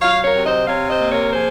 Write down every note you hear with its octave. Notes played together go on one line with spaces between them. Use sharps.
F#3 C#5 F5
A#4 C#5
C3
C5 D#5
C3 C#5 F5
C5 D#5
A#3
A#4 C#5
F3 G#4 C5